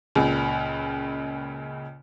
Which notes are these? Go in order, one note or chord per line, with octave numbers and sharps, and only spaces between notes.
C#2 A#2 C#3